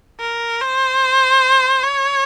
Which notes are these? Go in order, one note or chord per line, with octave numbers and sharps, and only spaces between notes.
A#4
C5
C#5